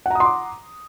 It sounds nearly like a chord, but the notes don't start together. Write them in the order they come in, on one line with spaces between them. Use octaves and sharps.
F#5 A#5 D#6 C6 D6